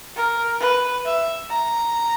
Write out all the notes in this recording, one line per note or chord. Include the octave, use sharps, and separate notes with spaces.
A#4
B4
E5
A#5